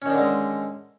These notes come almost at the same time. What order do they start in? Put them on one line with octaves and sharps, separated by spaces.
C#4 D#3 D4 D3 G#3